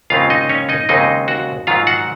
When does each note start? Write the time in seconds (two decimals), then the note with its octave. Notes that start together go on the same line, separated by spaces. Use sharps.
0.10 D#2 C#3 G#3 C4 F4 F5
0.30 D#4 D#5
0.49 C#4 C#5
0.69 D#4 D#5
0.89 D#2 C#3 G#3 C4 D#4 D#5
1.28 F#4 F#5
1.67 G#2 D#3 F#3 F4 F5
1.87 F#4 F#5